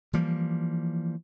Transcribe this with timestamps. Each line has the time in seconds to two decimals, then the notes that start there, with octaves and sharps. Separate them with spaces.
0.13 E3 F3 G3 A#3